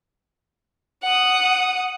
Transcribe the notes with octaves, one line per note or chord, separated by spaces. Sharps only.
F#5 D#6